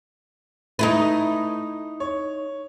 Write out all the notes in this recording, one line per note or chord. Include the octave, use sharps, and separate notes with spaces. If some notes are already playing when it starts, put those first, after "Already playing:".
A3 D#4 E4 B4 E5
C#5